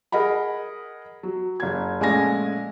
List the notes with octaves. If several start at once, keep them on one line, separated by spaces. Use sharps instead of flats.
G#4 A#4 D#5 F#5 B5
F#3
F#1 G#6
A#1 G#3 A3 C#4 G#5 A#6